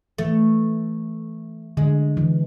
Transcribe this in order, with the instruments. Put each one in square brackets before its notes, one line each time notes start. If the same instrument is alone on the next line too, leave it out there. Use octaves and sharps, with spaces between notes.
[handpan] E3 [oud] A3
[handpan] D3 [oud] G#3
[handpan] E3